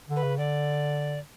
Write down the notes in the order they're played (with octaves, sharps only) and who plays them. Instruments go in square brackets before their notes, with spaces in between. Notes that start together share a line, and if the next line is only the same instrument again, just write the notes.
[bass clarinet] D3
[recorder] B4
[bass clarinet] C#3
[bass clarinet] D3 [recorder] D5